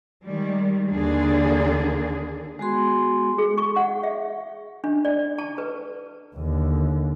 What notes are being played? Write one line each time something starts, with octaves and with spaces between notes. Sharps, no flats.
D#3 G3 G#3
D#2 D3 A#3 D4 G#4
G#3 B3 F#4 G#4 C6
G#4
C#6
F#5
E5
D4
D5
A5
B4
D#2 D3